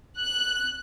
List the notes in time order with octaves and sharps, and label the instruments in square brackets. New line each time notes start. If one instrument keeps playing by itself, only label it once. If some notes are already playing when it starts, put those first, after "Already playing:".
[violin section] F#6